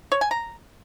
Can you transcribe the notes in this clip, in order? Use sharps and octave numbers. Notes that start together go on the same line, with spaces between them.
C#5
G#5
A#5